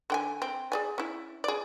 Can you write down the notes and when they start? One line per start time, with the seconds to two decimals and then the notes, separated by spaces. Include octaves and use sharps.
0.10 D3 G5 G#5
0.42 C4
0.72 G#4 D5 G#5
0.98 C#4 E4
1.44 G#4 D5